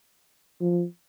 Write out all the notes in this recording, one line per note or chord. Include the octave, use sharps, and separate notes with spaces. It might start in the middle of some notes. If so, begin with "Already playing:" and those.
F3